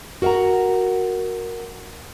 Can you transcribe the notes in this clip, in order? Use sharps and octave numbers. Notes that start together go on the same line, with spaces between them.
F#4 A#4 F5 F#5 A#5